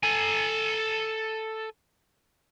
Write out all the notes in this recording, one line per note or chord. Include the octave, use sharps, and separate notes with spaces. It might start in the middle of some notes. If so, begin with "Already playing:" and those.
A4 G#5